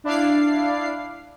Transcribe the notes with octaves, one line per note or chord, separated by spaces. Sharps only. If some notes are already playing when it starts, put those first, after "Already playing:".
D4 E4 D5 F5 C7